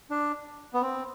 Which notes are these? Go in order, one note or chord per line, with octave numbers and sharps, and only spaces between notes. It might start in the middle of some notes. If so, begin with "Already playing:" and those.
D4
B3
C4